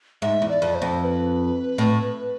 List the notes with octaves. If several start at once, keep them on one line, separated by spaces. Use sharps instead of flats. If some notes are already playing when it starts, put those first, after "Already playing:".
G#2 E5
E2
D5
F2
C5
F2
C5
B4
A2